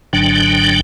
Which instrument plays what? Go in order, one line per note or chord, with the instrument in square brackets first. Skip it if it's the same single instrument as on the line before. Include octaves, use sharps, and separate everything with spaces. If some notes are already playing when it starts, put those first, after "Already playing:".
[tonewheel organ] G#1 G#2 D3 F#3 D4 G5